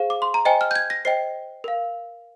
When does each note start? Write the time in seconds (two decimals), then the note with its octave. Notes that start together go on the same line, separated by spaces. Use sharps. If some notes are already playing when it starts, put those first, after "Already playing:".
Already playing: G#4 C5 F5
0.10 D6
0.22 C6
0.34 A#5
0.45 C5 D#5 G5 G#5
0.61 F6
0.71 G6
0.76 G#6
0.90 A#6
1.05 C5 D#5 G5 C7
1.64 A#4 F5